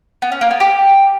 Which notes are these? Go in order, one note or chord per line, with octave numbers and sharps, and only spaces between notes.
B3
C#4
A#3
B3
G4